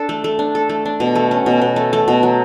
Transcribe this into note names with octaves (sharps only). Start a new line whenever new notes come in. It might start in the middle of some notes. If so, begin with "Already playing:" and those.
Already playing: D4 A4
A3
A3
D4
A4
A3
D4
B2
A3
C#4
B2
B2
A3
A3
B2
F#3